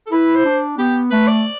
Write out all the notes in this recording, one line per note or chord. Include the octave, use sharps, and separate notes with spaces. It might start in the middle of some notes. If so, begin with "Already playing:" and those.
A4
E4 B4
C5
D4
B3 G4
A3 B4
D5